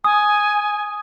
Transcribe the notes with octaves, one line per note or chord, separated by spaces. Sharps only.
G#5 D#6